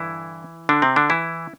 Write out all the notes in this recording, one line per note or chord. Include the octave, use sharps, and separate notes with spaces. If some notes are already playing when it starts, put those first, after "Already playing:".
Already playing: G2 D3 E3 E4
D3 D4
C3 C4
D3 D4
E3 E4